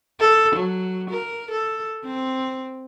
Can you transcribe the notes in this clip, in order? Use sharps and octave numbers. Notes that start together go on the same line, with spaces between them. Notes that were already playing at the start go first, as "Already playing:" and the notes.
A4
F#3
A#4
A4
C4